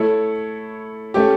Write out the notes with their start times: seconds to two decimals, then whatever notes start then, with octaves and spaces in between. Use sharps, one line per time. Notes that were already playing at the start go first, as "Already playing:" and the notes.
Already playing: A3 E4 A4 C#5
1.14 A3 C#4 G4